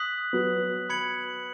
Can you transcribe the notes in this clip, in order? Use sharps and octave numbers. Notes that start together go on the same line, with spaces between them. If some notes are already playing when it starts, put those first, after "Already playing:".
Already playing: D#6 F#6 B6 F#7
F#3 B3
B5 G#6 C#7 F#7